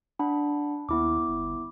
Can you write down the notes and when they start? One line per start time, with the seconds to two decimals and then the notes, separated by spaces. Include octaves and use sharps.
0.19 D4 F#5 B5
0.89 D#2 B3 E4 D6
1.28 G1